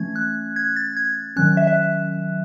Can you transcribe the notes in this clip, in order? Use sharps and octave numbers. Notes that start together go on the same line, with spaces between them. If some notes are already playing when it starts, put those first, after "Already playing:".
Already playing: E3 A3 C#4 G#6
F#6
G#6
A6
G#6
D#3 F#3 C#4 F#6
E5
E5